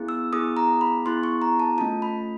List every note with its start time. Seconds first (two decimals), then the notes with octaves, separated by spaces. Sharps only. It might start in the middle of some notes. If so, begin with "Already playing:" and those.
Already playing: B3 E4 G#4
0.09 E6
0.33 B3 E4 G#4 D#6
0.57 A#5
0.81 B5
1.05 B3 E4 G#4 C6
1.23 C#6
1.42 A#5
1.59 A5
1.78 A3 C#4 F4 A5
2.02 B5